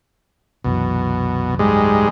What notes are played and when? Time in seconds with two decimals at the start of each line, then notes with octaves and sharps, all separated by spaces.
0.64 C2 F#2 B2 E3
1.59 G#2 G3 G#3